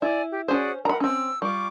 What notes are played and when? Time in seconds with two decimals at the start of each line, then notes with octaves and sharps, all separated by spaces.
0.02 E4 D5 G#5
0.31 G4
0.48 C#4 F#4 G#4 C5 D5
0.85 A#4 F#5 A#5 B5
1.00 C4 C#4 E6
1.42 G3 F4 C#6 D6